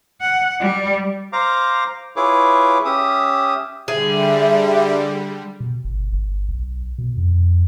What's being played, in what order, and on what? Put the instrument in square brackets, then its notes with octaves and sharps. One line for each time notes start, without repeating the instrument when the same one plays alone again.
[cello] F#5
G3
[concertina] C5 F5 A#5 D6
E4 F4 G#4 B4 C#5 D6
C#4 G4 E5 D#6
[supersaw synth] D3 G3 [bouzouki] G#4 [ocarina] E5
[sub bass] B2
G1
G1
B1
B2
F2